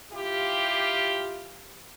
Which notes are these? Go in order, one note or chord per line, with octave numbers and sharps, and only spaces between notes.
E4 F4 G4